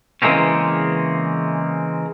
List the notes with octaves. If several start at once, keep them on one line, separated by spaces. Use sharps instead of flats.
C#3 E3 G#3 A#3 C4 C#4